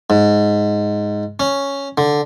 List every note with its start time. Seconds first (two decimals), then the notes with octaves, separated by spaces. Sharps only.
0.10 G#2
1.40 C#4
1.98 D3